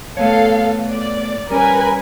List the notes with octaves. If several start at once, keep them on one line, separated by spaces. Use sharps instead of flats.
A3 B3 A4 C#5 F5
D5
G3 C#4 A#4 B4 G#5